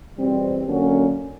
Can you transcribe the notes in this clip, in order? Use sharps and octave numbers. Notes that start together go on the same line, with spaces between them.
E2 B2 G3 C4
D3 F#3 A#3 C#4 F#4